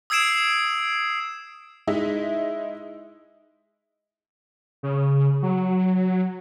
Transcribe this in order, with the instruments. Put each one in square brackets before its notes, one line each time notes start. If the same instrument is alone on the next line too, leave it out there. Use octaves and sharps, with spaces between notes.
[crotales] D#6 E6 G#6 C7 D7 E7
[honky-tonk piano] G#3 D#4 E4 D#5 E5
[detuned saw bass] C#3
F#3